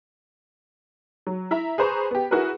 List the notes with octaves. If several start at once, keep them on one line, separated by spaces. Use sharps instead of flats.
F#3
E4 E5 A#5
G#4 B4 C5 A#5 B5 C#6
B3 G4
E4 F#4 G#4 A#4 B4